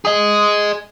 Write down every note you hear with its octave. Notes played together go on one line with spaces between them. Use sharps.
G#4 D#5